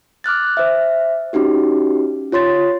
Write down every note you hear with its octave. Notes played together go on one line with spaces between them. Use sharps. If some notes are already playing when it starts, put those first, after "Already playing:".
D6 F6 F#6 A6
C5 E5
C#4 D#4 F#4 G4
F4 C#5 C6 A6